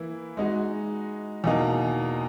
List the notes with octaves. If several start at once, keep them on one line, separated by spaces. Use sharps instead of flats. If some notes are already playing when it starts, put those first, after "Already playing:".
Already playing: E3 A#3 E4
G#3 D#4 F#4
E2 B2 A#3 D#4